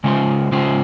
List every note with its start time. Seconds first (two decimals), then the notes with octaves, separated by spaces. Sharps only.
0.04 C#3 G#3 C#4 F4 C5
0.52 C#3 G#3 C#4 F4 C5